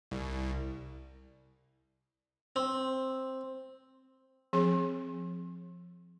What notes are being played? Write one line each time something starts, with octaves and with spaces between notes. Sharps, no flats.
C2
C4
F3 C4 G#4